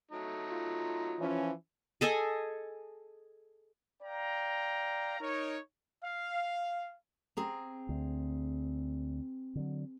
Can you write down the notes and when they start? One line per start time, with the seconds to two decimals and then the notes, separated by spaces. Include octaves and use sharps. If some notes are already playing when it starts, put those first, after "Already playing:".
0.11 F#3 A3 D#4
0.51 F4
1.19 E3 F3 C#4
2.01 G#4 A4 D#5 G#5
4.02 D5 F5 G5 A#5
5.20 D#4 A#4 C#5
6.04 F5
7.37 C4 G#4 A#5
7.89 D2
9.55 D3 F#3